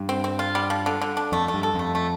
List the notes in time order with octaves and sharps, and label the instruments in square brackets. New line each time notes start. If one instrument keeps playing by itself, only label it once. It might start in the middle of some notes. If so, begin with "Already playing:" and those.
Already playing: [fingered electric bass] G2
[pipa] C4
C4
F4
G3
F3
D3
D3
D4
[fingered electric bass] F2 [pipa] A3
[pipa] A3
[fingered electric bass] G2
[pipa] A4
[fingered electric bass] F2
[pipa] A3
A3